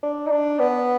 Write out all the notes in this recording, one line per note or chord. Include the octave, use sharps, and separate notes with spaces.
D4
D#4
D4
B3